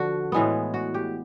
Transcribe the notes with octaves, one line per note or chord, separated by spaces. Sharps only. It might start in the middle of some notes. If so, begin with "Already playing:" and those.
Already playing: D3 F3 F#4
A2 E3 G#3 B3
F#4
G4